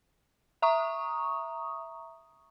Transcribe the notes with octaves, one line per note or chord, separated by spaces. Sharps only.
E5 A#5 C#6 D#6